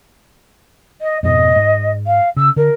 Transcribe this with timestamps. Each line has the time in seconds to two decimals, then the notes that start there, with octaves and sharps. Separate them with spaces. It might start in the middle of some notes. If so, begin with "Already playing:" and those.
1.01 D#5
1.23 F2 G#2 B2 D#5
1.56 G#2
2.06 F5
2.36 C#3 E6
2.56 D3 A#4